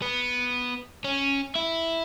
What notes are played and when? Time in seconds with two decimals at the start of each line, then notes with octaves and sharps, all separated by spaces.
0.02 B3
1.04 C#4
1.55 E4